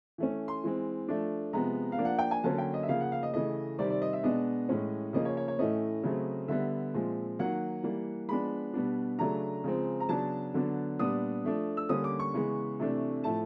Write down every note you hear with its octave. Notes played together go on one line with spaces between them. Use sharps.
E3 A3 C#4
C6
E3 G#3 C4
F3 A3 D4
C3 F3 G#3 B3 A#5
F5
F3 A#3 D4
F#5
G5
G#5
D3 F#3 A#3 C#4 A5
G5
D#5
E5
C#3 F3 A#3 F5
F#5
F5
D#5
C#3 E3 A3 D#5
C3 D#3 G3 C4 D5
D5
D#5
E5
B2 G#3 B3 D4 D#5
A2 E3 G#3 C#4
C#3 F3 A#3 C#4 D#5
C#5
C#5
C#5
A2 E3 A3 C#4 D#5
C#3 F#3 A3 C4
D3 G3 B3 E5
A#2 F3 G#3 C4
D#3 F#3 A#3 F#5
E3 G3 A#3
F3 G#3 B3 D4 B5
B2 G3 B3 D4
C#3 F#3 A3 D4 A#5
C#3 F3 G#3 C4
A#5
C#3 F#3 B3 D4 A5
D3 F#3 B3 D4
A#2 G3 B3 D4 D#6
F3 A3 D4
E6
D3 G3 A#3 C#4 D#6
D6
C#6
C#3 E3 G#3 B3
C3 E3 A3 D4
A2 F3 A3 A5